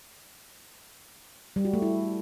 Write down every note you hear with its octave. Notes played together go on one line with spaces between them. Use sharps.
G3
F#4
A3
E4